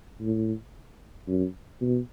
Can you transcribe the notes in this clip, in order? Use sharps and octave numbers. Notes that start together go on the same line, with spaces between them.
A2
F#2
B2